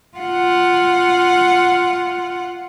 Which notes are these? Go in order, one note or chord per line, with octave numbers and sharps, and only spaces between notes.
F4 F#5